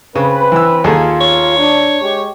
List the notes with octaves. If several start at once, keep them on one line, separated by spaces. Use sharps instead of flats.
C#3 C4 B4
E3 E6
D#2 F4 G#4 A4
C#5
D4
G#3 G4